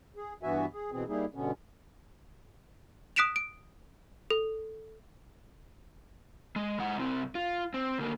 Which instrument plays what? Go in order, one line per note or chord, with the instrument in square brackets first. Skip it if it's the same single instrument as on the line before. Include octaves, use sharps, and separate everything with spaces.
[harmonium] G#4
G2 E3 B3 F#4 E5 G#5
G#4
B2 E3 C4 G#4
G3 A#3 D#4 E4 G#4
G2 B2 D3 B3 C#4
[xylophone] D#6 F#6 B6 D7 E7 F7
D7
A4
[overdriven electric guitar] G#3
G#3 F#5
C2 C4
F4
C4
D2 A#3